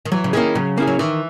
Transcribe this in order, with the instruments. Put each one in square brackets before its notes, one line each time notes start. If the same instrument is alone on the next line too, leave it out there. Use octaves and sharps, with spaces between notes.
[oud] D#3
[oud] E3 [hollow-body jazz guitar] F#3
[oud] C#3
[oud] D#3 [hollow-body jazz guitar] A#3 C#4 E4 G#4
[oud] C#3 [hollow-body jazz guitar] F#3
[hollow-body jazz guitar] A#3 C#4 E4 G#4
[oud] F#3
[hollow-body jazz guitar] D#3 [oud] E3